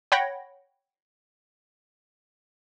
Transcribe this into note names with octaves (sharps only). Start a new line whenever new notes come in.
C#5 F#5 G5 B5 G#6 A#6